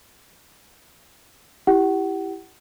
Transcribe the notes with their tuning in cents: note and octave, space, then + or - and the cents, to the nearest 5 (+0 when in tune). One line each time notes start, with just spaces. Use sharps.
E4 +10 G4 +0 F#5 +30